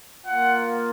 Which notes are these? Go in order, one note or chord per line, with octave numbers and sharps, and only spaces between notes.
F4 F#5
A#3